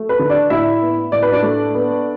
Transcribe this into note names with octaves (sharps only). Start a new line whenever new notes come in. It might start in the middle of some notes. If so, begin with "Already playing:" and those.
Already playing: A3
B4
D3
D4 D5
A2 E4 E5
B3
A2 D5
B4
D4 D5
A3
B3